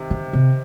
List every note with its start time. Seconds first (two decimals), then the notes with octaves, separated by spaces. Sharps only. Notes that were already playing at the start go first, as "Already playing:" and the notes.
Already playing: C3 D#3
0.11 D3
0.33 C3